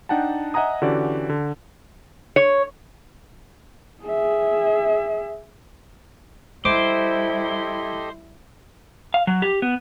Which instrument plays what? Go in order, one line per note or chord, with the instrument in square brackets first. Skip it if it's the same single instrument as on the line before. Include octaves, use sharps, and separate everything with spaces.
[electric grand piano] D4 D#4 F#5 G5 A5
D#5 E5 F#5 G#5 A#5 D#6
D3 E3 C#4 F#4 G4 D5
D3
[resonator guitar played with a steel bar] C#5
[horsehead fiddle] G#4 E5
[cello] G3 E4 [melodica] G4 A4 D#5 [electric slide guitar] C5 [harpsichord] D6
[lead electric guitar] F5
F#3
G4
B3